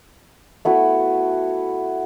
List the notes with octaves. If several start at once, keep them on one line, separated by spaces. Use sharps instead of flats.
A3 B3 E4 F#4